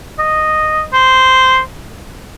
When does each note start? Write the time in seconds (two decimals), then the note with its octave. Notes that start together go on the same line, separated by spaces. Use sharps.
0.19 D#5
0.93 C5